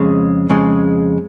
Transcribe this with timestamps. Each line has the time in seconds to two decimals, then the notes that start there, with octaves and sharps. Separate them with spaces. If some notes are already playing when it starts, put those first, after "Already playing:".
Already playing: F2 C#3 G#3
0.50 F2 C#3 G#3